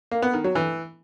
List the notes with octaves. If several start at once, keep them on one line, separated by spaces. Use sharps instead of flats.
A#3
B3
D#3
F#3
E3